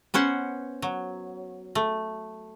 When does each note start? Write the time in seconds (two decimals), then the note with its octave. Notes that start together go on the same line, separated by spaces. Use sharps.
0.14 B3 C#4 C5 F#5
0.82 F#3
1.75 A3